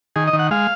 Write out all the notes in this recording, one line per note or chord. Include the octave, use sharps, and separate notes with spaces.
D#3 G#4
D#5
D#3
F#5
G#3 F5